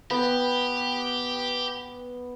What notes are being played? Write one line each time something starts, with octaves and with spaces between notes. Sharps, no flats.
B3 G4